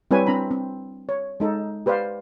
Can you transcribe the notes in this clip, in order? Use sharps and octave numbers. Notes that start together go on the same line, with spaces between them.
G3 C4 E4 B4 C#5 G#5
C4 D4 A#5 B5
C4
C#5
G#3 D#4 A4
G4 B4 C5 D5 F5